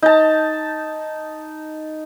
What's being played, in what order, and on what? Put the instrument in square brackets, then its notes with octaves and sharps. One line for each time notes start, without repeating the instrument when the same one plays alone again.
[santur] D#4 A5